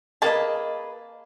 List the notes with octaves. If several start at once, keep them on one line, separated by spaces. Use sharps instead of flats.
A#3 G#4 B4 D#5 A5